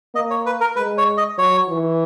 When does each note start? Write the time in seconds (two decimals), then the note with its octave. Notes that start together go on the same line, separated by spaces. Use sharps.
0.15 A#3 D#5
0.31 C#5
0.46 B4
0.61 A#4
0.76 G#3 B4
0.98 C#5
1.17 D#5
1.38 F#3 C#5
1.69 E3